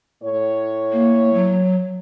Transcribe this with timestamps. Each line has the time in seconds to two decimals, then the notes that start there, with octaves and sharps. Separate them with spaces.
0.23 A2 C#5
0.92 A#3
1.34 F#3